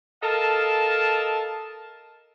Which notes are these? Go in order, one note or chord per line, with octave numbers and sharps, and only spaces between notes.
A4 A#4 D#5 F5 A5